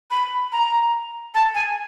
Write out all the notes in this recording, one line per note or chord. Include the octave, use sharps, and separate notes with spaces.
B5
A#5
A5
G#5